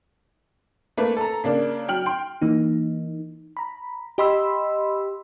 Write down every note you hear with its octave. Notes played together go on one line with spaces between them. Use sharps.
A3 A#3 B4
A4 A#5
C#3 A#3 D4
F#3 G5 F6 F#7
G5 C6
E3 A#3 D#4
A#5 B5
G4 D#5 B5 C6 E6